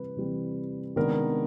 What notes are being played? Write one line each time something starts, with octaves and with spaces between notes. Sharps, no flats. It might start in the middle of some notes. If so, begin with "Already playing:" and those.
Already playing: C3 E3 G3 C4 B4
C3 E3 G3 C4
C3 D#3 G#3 B3 D4 A#4